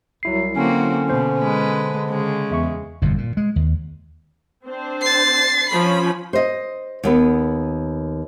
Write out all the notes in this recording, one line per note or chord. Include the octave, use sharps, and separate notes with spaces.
C2 F#3 E4 C7
D3 A#3 C4 C#4 F#4
B2 C5
G#3 B4
C#3 G#3
E2 E5 C#6
G1 F2 B2
A#2
G#3
D#2
C4 D4 C5
A6 C7
F3 C#4 B5
C5 D#5
D#2 B3 B4